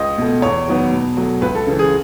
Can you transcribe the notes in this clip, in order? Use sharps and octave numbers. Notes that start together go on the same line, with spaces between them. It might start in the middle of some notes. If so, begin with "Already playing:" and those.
Already playing: C#2 D#5
B2 A3
E2 C#5
D#3 F#3 B3
B2
F#3 A3
C#2 B4
A4
C#3 E3
G#4